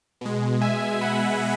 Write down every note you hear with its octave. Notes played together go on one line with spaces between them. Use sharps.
B2 G#3
E5 G#5
F#5 B5